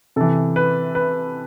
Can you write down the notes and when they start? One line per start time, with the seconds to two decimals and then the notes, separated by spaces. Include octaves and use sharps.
0.16 C3 E3 A4
0.56 B4
0.95 B4